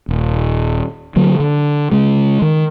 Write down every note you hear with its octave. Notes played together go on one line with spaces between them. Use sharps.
D#1
D3 F#3 A#3
D3
C#3 G#3
D#3